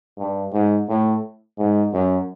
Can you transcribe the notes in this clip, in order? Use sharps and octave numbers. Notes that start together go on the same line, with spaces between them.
G2
G#2
A2
G#2
F#2